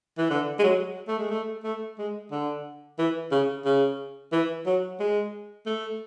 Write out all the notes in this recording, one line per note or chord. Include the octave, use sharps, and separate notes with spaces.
E3
D3
G#3
F#3
A3
G#3
A3
A3
G#3
D3
E3
C#3
C#3
E3
F#3
G#3
A3